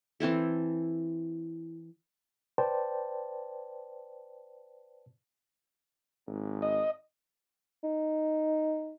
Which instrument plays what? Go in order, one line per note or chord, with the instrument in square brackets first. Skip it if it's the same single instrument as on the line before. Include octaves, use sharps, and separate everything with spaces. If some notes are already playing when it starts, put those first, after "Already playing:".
[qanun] E3 C4 E4 A4
[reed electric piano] B4 C5 D5 G5 A5
[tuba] G#1
[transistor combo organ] D#5
[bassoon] D#4